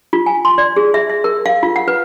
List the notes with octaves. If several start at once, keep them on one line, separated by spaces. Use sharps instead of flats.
F4
G#5
C6
D5
G#4
E5
E5
A#4
F5
F4
F#5
B4